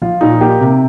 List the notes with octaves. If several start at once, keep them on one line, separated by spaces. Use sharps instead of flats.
F3 F4
A#2 D#4
A#3 G4
C3